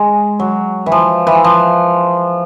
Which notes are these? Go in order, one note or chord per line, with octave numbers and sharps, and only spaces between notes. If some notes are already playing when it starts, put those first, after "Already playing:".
Already playing: G#3
F#3
E3
F3
E3
F3